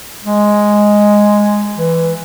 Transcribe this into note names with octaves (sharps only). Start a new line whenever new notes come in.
G#3
E3